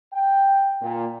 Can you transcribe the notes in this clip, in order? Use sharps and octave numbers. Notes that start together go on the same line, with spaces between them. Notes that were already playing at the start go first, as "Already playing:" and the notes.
G5
A#2